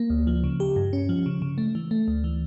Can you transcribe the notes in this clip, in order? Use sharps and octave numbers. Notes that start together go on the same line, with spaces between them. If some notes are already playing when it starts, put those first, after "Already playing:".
Already playing: A#3
D2
F3
C#3
G4
G2
C#4
F3
C#3
C#3
A3
E3
A3
D2
E3